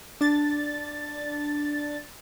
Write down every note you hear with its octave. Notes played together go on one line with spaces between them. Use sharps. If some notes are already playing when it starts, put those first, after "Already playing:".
D4 A6